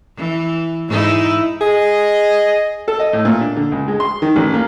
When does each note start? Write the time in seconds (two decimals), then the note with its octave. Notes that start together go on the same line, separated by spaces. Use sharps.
0.18 E3
0.89 G#2 D#4 E4
1.61 G#4 D#5
2.88 A4
2.99 D#5
3.13 A2
3.25 A#2
3.41 D4
3.57 D3
3.72 C#2
3.88 G#3
4.00 C6
4.22 D#3
4.36 A1
4.54 A#3